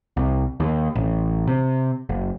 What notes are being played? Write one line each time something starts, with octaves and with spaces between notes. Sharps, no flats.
C2
D#2
A1
C3
F#1